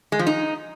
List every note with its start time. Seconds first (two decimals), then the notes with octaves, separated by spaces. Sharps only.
0.12 G#3
0.19 F3
0.27 D#4